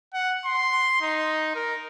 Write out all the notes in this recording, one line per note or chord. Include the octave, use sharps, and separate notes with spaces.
F#5
C6
D#4
A#4